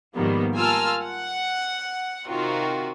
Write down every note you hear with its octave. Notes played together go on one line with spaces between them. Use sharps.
G#2 D#3 F3 G3 A#3 B3
F4 A#4 G#5 A5 E6 F6
F#5
C3 D#3 F4 F#4